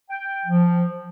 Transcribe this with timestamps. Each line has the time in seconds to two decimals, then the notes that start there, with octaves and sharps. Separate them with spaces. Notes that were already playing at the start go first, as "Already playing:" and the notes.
0.10 G5
0.46 F3